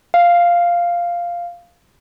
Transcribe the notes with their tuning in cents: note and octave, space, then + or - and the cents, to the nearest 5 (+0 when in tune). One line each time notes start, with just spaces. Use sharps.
F5 -5